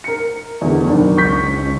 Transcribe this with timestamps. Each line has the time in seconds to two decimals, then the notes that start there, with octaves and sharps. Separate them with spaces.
0.04 A#4 C#7
0.61 E2 B2 D3
0.87 F#1 D#3 D4
1.17 C#2 C#6 G6 B6